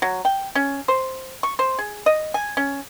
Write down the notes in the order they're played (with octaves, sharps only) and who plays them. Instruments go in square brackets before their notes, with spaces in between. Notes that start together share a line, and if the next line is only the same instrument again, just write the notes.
[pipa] F#3
G5
C#4
C5
C#6
C5
G#4
D#5
G#5
C#4